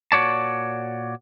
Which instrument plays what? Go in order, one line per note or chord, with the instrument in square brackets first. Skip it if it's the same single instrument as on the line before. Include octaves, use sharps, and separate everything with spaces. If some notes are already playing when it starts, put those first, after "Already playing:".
[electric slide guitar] A#2 F#4 C#5 D5 A5